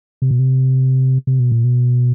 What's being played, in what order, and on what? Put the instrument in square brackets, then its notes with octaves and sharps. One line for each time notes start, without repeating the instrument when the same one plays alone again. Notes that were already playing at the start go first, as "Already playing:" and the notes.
[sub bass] C3
B2
C3
C3
B2
A#2
B2